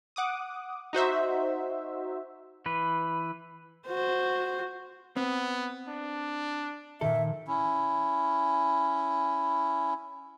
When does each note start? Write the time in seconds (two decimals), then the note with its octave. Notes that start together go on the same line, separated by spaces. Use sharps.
0.16 F#5 D6 D#6
0.93 D#4 F#4 C5 E5
2.66 E3 B4
3.87 F#4 C5
5.16 B3 C4
5.88 D4
7.01 A#2 D#3 A4 E5
7.47 C#4 E4